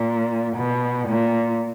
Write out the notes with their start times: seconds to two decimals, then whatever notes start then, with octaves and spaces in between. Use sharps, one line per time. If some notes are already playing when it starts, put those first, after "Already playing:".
Already playing: A#2
0.56 B2
1.07 A#2